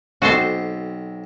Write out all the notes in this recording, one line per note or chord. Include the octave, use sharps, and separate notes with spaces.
B1 C4 F#4 A4 C5